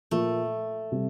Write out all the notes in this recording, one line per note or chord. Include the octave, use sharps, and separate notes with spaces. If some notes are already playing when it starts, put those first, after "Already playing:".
A#2 F3 A3 A#3 F4 A4
C3 G3 C4